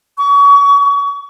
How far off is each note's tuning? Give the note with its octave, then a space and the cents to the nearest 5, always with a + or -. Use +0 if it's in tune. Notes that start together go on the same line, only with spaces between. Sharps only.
C#6 +35